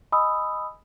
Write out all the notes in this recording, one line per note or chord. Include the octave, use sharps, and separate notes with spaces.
D#5 G#5 B5 D#6 E6